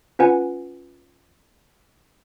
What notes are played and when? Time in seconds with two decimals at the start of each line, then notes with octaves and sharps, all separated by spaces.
0.19 C#4 F4 B4 F#5 G#5